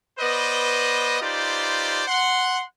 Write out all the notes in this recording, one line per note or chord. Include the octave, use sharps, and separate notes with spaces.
B3 B4 C5 D5 D#5
D#4 F4 G4 B4 C5 D5
F#5 C6